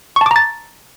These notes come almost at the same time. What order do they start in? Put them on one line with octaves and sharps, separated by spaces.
C#6 A5 D6 A#5 A6